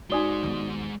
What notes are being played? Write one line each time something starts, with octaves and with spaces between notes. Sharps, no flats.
G#3 D#4 F#4 C5 D5 G#5 D#6 G7
D#2 B3